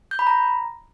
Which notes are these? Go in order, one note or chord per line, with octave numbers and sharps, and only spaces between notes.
G6
B5
A#5